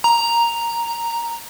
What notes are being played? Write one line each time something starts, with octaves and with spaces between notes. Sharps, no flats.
A#5